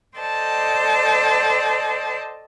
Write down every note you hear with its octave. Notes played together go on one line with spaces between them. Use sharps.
A4 C5 D5 D#5 G5 A5